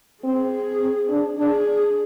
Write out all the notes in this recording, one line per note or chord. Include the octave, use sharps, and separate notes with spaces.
C4 G#4
C4
D4
D4 G#4